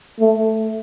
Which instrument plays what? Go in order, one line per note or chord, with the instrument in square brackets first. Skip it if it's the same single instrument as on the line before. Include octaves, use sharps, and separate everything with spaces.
[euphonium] A3